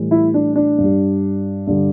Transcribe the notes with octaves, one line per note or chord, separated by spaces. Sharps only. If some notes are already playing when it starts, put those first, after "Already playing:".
Already playing: A2 E3 G3
E4
D4
D4
G2 G3
G2 D3 G3